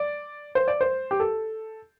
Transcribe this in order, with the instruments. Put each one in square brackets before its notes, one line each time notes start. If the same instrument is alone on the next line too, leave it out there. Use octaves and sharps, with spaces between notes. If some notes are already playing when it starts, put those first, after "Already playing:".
Already playing: [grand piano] D5
C5
D5
C5
G4
A4